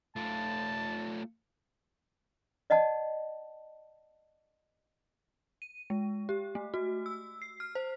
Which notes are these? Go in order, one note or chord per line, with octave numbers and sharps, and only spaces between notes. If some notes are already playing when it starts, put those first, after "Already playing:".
A3 F4 A5
D5 D#5 F#5 A5
D#7
G#3
G4
A3
F#4
E6
C7
F6
C5